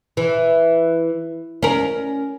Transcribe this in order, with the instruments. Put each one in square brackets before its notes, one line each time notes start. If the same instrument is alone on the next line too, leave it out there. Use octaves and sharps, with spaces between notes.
[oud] E3
C#4 A#4